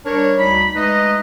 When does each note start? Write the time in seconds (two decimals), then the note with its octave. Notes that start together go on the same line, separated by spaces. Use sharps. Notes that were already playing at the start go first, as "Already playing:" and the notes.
0.05 G3 D4 A#4 C#5
0.38 D2 G3 D#4 B5
0.75 G#3 A3 D#4 B4 D#5